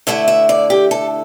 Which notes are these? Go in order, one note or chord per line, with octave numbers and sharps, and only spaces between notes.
D3 A3 E4 E5
E5
D5
G4
A4